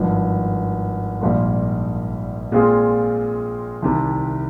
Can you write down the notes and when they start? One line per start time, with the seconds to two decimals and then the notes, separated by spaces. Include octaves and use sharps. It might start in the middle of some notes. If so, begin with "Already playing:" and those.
Already playing: G#1 G2 F3
1.21 A#1 G#2 G3 A#3 F4
2.52 A#2 G#3 C4 F4 G#4
3.82 C2 C3 D#3